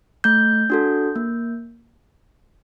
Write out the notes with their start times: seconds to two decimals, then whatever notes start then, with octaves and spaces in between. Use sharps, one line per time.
0.24 A3 G6
0.70 D4 F#4 A4
1.16 A#3